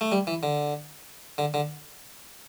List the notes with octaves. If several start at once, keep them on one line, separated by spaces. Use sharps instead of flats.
A3
G3
E3
D3
D3
D3